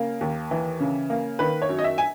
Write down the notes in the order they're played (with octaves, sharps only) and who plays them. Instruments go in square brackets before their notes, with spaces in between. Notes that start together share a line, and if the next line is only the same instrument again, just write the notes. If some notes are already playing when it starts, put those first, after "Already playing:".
Already playing: [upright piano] C#3 A#3
D#2
E3
C#3
A#3
D#3 B4
C#5
F#2
D#5
E5
G#5